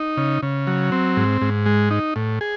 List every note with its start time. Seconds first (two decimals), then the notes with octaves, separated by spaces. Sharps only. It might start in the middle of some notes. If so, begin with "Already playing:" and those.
Already playing: D#4
0.17 C#3
0.42 C#3
0.67 F#3
0.92 C4
1.17 G#2
1.41 G#2
1.66 G#3
1.91 D#4
2.16 A2
2.41 G#4